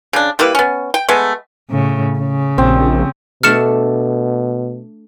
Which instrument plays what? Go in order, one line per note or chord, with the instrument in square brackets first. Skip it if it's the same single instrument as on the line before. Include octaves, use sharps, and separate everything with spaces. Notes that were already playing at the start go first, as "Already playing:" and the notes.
[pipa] C#3 D4
G3 A#3 E4 B4
B3 C#4
G5
G#3 A3 B3
[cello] A2 C#3
C#3
[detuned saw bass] A#1 [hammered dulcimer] C4
[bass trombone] B2 [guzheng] A3 D4 A4 [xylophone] F6 C#7 E7